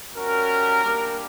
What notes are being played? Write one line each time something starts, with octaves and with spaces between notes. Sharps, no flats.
G3 C#4 F#4 A#4
G3 A#3 D4 G4